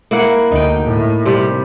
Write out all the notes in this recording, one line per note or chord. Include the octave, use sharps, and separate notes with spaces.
A#3 E4 F#5
D2 D#4 G5
A2
C3 G3